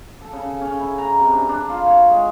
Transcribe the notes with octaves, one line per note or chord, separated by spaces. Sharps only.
A4
C#3
C#4
E4
A#5
C3
D4
D4
F4
C#5
G#3